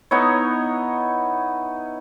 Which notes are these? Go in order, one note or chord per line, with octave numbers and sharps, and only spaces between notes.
B3 D#4 E4 C#5